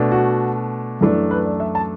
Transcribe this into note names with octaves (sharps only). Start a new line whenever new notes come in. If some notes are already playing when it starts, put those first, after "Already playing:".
Already playing: B2 A3 D4
F#4
F#2 E3 A3 D4
B4
D5
E5
A5